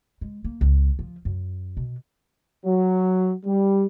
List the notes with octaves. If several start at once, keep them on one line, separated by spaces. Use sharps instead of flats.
G#3
A#3
C#2
F3
F#2
B2
F#3
G3